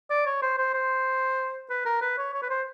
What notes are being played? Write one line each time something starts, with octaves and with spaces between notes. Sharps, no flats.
D5
C#5
C5
C5
C5
B4
A#4
B4
C#5
C#5
B4
C5